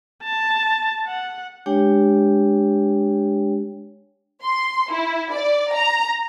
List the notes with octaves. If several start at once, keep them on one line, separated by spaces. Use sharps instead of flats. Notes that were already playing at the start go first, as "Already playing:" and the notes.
A5
F#5
G#3 D4 G4 C#5 G5
C6
E4
D5
A#5